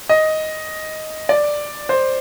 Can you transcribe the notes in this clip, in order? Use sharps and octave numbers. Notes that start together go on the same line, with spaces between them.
D#5
D5
C5